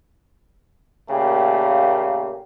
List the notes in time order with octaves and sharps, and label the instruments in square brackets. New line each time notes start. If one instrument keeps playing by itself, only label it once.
[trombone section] A#2 C#3 A3 A#3 G4